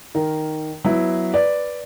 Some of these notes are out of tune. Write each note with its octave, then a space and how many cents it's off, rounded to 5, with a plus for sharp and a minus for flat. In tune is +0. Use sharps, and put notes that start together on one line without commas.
D#3 +0 A#4 +0
F#3 +0 B3 +0 E4 +0
B4 +0 D5 +0